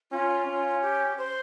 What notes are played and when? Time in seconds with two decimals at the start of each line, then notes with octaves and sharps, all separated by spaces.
0.11 C#4 F4
0.46 C#4
0.81 G4
1.17 C5